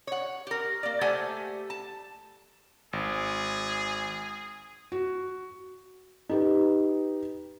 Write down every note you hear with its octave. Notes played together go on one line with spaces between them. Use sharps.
C#5 F#5
G4 A#4
A#3 D5
A3 G4 A4 C5 F#5 G#5
A5
G#1 G#4
F#4
D#4 G4 B4